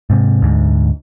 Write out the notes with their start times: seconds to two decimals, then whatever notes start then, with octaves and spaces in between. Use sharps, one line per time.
0.10 G#2 C3
0.42 D2 G#2